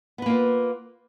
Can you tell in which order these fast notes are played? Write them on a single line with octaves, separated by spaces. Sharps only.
B3 B4 A#3 F4